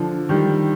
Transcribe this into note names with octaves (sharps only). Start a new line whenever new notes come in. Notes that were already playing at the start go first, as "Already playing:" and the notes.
Already playing: D3 F3
D#3 G3